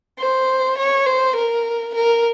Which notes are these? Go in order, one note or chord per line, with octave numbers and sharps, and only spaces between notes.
C5
C#5
C5
A#4
A#4